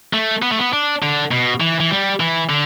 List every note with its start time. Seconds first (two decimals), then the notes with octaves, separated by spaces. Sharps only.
0.13 A3
0.42 B3
0.51 A3
0.59 B3
0.73 D4
1.03 D3
1.32 B2
1.60 E3
1.80 E3
1.91 G3
2.20 E3
2.50 D3